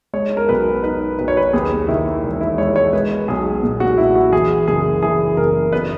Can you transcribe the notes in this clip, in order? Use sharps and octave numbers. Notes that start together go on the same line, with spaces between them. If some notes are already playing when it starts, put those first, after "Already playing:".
G#3 C#5
A#4
B1 B4
D#4 B4
B1 B4
C#5
B4
D#2 G#4
D#3 E4
E1
E4
G#3 C#5
C#5
G#3 B4
B1 G#4
A#2 G#4
F#4
B1 E4
F#4
E3 G#4
F#1 G#4
E3 G#4
F#1 A#4
B3 B4